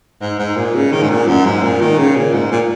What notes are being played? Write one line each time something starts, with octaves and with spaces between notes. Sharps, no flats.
G#2
G#2
A#2
C#3
D#3
G#2
A#2
F#2
G#2
A#2
D#3
C#3
A#2
G#2
A#2